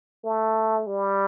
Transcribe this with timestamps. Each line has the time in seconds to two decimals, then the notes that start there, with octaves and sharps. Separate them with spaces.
0.25 A3
0.87 G3